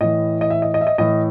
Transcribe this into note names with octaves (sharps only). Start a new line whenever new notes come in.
A2 E3 D#5
D#5
E5
D#5
D#5
E5
D#5
A2 E3 D#5